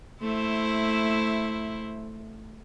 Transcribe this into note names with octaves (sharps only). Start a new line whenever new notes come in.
A3 E4 C5